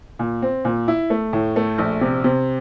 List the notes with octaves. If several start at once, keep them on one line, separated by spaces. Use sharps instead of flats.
A#2
C4
A#2
E4
A3
A2
A3
A#1
C3
C3